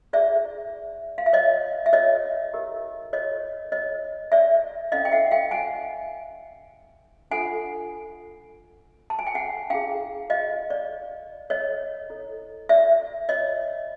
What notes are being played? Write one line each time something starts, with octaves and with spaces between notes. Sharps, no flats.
E4 G#4 C5 D5 E5
F5
E5
C#5 D#5
E5
C#5 D#5
E4 G4 A#4
C#5 D#5
C#5 D#5
D5 E5
C#4 E4 A4 C#5 D#5 F5
G5
E5 F#5
F5 G5
F#5 G#5
D4 F4 A4 C5 F#5 G#5
A5
G#5
G5
F#5 G#5
C#4 E4 G#4 F5 G5
D#5 F5
D5
C#5 D#5
E4 A4 C#5
D5 E5
C#5 D#5